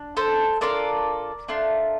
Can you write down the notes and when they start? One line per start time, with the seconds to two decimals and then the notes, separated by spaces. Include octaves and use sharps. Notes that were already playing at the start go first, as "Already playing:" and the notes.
Already playing: D4
0.17 A4 C5
0.61 D4 F4 A4 A#4 D5
1.48 A3 D4 F4